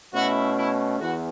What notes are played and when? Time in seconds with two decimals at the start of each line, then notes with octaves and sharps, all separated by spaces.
0.13 B2 A3 C#4 E4 F#4
0.56 E4
0.99 E2 E3 B3 F#4